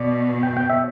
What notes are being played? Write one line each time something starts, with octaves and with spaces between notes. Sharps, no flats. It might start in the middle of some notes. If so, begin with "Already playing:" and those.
Already playing: B2 D5
G5
G5
E5